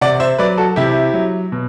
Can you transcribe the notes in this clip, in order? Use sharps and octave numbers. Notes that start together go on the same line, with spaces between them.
C3 D5 F#5
C5 E5
F#3 B4 D5
F#4 A4
C3 E4 G4
F#3
B2